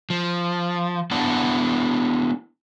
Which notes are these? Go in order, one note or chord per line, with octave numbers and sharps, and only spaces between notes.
F3
B3 D4 E4 D5 F#5 A5